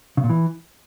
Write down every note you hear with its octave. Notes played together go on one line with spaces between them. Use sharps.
C#3
A#2
E3